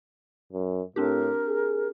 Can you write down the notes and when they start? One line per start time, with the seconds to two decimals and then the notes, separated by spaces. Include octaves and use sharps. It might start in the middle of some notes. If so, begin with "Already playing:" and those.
0.52 F#2
0.96 A2 C4 D4 G4 A#4
1.47 G#4